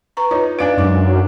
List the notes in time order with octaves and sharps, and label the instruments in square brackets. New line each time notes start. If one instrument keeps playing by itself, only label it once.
[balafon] B4 A#5 C#6
[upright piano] D#4 [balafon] F4 B4 C#5
[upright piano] D4 D7 [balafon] B4 F5 G#5
[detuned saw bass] F#2 [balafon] G#3 D#4 D6